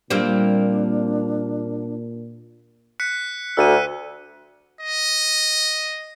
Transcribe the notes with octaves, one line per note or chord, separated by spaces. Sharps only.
A#2 G3 A#3 C4 D4
F#6 B6 C#7
D2 E6 D#7
D#5